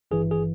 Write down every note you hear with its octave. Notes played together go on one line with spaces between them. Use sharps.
G#1 G2 E3 G#4
G#4